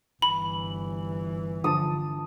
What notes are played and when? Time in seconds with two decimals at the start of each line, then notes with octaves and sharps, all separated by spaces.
0.22 G1 E3 B5
1.64 D3 F3 A5 D#6